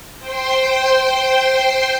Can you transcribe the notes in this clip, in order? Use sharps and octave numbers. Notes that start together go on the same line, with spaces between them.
C5 G5 C6